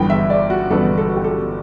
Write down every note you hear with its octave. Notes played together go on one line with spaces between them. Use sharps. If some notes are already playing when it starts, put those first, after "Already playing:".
Already playing: G1 G2 E3 B3 G5
E5
D5
F#4
G1 G2 E3 B3 A4
A4
F#4
G4
A4